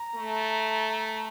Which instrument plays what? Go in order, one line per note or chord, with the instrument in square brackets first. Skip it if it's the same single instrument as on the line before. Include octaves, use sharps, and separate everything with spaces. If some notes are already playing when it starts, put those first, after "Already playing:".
Already playing: [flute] A#5
[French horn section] A3